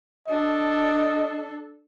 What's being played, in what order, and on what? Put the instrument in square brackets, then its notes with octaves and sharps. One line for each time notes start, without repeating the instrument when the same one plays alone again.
[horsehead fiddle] D4 A4 [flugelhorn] D#5